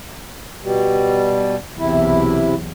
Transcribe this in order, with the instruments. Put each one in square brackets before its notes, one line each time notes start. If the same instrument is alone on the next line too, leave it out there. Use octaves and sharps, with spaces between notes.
[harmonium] B2 G3
[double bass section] B1 E2 [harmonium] C3 E4